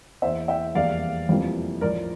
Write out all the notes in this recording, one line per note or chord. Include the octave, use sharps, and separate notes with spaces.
E2 E3 A#3 C5 E5
E5 G5
F1 E2 E3 G3 A#3 D5 F5
F1 F2 E3 G3 A#3
A#1 A2 F3 A#4 D5